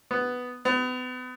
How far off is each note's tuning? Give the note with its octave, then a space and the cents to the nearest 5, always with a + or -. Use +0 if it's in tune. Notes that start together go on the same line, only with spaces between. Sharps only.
B3 +5
B3 +35